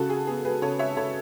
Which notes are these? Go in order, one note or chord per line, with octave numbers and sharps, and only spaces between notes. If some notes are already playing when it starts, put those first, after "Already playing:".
Already playing: C#3 F#4 A4
G#4
B3 G#4
G#4 B4
C#3 A4 C#5
C#5 E5
C#3 A4 C#5